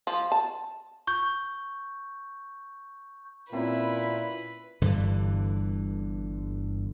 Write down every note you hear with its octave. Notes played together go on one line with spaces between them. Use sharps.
F3
A5
C#6 G6
A#2 A#3 C4 C#4 E4 B4
G1 G2 D3 E3